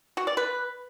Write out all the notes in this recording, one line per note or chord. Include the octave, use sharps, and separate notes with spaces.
F#4
D5
B4